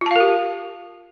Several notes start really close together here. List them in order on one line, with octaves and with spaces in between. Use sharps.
F4 A5 F5 A#4 G4